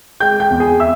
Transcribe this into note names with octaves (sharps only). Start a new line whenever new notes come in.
G#3 G5 G6
G5 G6
E2
G#4 G#5
E5 E6